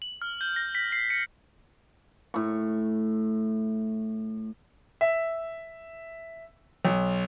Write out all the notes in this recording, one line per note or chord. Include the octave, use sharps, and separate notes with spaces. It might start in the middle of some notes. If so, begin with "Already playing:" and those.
F#7
F6
G6
A#6
B6
C7
C#7
A2 C#6
E5
B1